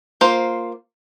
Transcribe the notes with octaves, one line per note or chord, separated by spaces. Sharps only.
A#3 F4 C5